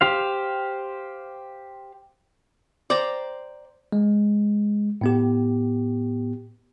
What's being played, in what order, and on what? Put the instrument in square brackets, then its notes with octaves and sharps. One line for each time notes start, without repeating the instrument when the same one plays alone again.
[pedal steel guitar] G4 C5 F5
[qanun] C5 G5 A#5 [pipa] D5
[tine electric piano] G#3
A2 B3 G4